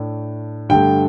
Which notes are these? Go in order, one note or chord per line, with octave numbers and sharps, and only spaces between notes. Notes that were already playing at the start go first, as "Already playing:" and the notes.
Already playing: A2 A3 D4
G2 D3 A3 G5